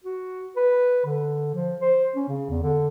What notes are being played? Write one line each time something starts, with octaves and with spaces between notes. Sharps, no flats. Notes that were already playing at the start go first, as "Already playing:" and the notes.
F#4
B4
D3
F3
C5
C#4
C#3
E2
D3